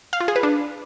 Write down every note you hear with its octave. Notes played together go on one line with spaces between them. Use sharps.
F5
F4
G#4
B4
D4